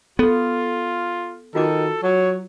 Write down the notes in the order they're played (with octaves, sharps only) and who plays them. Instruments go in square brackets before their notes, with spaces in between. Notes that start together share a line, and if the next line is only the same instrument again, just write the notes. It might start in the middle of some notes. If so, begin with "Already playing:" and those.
[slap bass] B3 [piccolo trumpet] F4 [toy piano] A4
[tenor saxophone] D#3 [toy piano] F4 F#4 D6 [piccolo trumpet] A4
[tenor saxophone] F#3 [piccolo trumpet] C#5